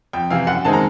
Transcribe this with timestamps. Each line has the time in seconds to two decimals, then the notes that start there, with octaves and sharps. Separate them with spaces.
0.13 F2 G5
0.30 C3 E3 F5
0.47 F#2 F#5
0.65 D#3 G#3 C4 A5
0.73 A#5